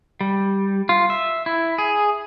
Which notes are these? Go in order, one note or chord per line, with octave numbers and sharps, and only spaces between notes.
G3
F4
E5
E4
G#4